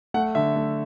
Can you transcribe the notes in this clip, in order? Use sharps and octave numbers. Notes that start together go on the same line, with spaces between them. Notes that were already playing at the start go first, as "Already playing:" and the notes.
A3 F#5
D3 E5
A3